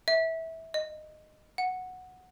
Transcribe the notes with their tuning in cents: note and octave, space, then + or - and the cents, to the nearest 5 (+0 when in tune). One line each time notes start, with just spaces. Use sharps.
E5 -20
D#5 -15
F#5 -5